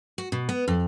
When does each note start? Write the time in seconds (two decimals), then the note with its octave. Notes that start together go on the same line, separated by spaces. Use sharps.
0.18 F#4
0.32 B2
0.49 B3
0.68 F2